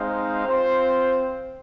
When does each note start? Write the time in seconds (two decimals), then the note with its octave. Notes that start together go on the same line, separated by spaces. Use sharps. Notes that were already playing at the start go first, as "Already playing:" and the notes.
Already playing: G#3 C4 D#4 C5 F5
0.46 C4 F4 C5